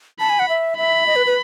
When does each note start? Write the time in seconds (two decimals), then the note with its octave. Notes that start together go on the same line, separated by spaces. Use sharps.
0.19 A5 B5
0.29 G#5
0.39 F#5
0.49 E5
0.78 E5 B5
1.07 D#5
1.16 B4
1.26 B4